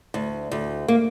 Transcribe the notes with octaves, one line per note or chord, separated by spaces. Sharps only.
D2
D2
A#3